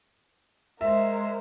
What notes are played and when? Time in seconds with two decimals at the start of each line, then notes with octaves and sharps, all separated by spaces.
0.81 G#3 A#4 C5 E5